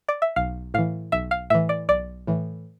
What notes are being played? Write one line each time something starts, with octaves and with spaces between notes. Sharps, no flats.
D5
E5
B1 F5
A2 E3 F5
B1 E5
F5
A2 E3 E5
D5
B1 D5
A2 E3